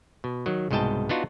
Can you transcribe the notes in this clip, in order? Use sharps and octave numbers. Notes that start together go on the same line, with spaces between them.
B2
D#3 F#3
C2 G#2 B2 D#5 G5 A5
B3 D4 D#4 F4 F#4